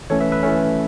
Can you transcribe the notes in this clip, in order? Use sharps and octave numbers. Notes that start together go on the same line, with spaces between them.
E3 A3 C#4 A4 C#5
B4 E5
B4 E5
E3 A3 C#4